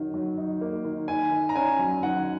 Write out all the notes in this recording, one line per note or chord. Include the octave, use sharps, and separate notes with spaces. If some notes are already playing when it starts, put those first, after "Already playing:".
Already playing: D#3 F#3 D#4
F#3
D#4
A#3
D#3
D#3 G#5
D#3
A#5
C#4 G#5
F#3
D#3 F#5